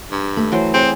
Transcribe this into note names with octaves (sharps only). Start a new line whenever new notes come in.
G2
A3 B5
E3 F#3 C5
C4 G#4 C#5